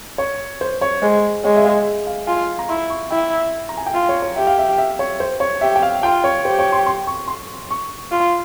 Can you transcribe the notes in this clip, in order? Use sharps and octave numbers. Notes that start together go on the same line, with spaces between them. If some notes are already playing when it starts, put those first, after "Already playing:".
C#5
C5
C#5
G#3 C5
G#3 C#5
E5
F5
F5
F4 G#5
A#5
E4 C6
C#6
E4 G5
A#5
G#5
G5
F4 F5
C#5
C#5
G4 E5
F5
E5
E5
C#5
C5
C#5
G4 E5
G5
F5
F4 G5
C#5
G4 C5
C#5
C6
C6
C#6
C6
C#6
F4